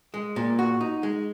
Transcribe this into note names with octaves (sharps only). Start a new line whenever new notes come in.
G#3
A#2
F#4
D#4
G#3